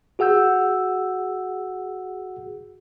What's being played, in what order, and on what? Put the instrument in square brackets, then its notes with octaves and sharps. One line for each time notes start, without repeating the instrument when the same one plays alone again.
[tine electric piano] F#4 G#4 F#5 E6 G6